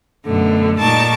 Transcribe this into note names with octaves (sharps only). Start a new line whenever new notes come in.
F#2 B2 D3 A3
A#2 G#3 D#4 A5 C#6 D6